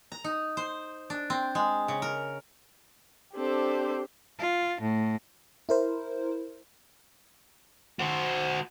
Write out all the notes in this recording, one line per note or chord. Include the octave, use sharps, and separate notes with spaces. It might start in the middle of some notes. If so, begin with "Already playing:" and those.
A#5
D#4
C5
D4
C4
G#3
C#3
A#4
C4 D4 G4 A4 C5
F4
A2
E4 A#4 C5
F#4 C5